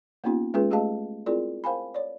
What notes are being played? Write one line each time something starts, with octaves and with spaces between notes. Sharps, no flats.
A#3 B3 C#4 D#4 F4 G4
G#3 C#4 F4 G#4 B4
A3 G4 G#4 D#5 F5 A5
C4 E4 F4 G#4 A#4 D5
A#4 C5 F5 G5 G#5 B5
C#5 D5